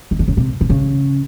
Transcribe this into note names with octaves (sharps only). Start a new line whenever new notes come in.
D#3
D3
C#3
C3
C3
C#3